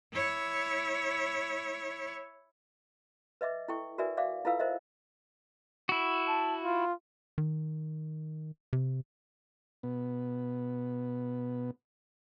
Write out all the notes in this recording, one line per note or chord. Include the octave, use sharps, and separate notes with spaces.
E4 C#5
B4 D#5 E5 D6
E4 A4 G5 C#6
F#4 A#4 B4 D5 E5 G#5
D5 E5 F5 D6
E4 F4 A4 B4 F5 E6
A#4 C5 D#5 E5
E4 F#4
A5
F4
D#3
C3
B2 B3